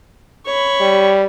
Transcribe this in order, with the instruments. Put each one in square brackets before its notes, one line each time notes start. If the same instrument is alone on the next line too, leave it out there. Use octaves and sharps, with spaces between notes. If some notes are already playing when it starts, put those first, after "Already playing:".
[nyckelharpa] C#5 B5
[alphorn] G3